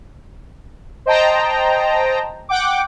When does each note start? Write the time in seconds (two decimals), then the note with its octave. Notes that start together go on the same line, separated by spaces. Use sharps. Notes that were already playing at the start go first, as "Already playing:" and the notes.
1.06 C5 D#5 G5 A5 A#5
2.49 F#5 G5 D6